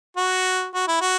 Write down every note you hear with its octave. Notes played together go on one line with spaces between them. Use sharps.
F#4
F#4
E4
F#4